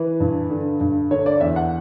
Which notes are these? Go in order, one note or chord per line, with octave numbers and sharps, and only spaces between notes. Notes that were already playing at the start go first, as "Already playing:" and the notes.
Already playing: E3 B4
G2
D3
G2
D3 C#5
D5
E2 E5
F#5